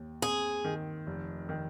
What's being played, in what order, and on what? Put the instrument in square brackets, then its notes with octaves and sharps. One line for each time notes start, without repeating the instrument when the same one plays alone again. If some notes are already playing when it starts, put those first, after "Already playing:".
Already playing: [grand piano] D#2
[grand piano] C4 [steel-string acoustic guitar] G#4
[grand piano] D#3
F1
D#3